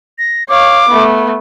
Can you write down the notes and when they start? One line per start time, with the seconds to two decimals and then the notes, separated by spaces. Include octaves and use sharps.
0.19 A#6
0.49 C#5 F5 D6
0.89 A3 B3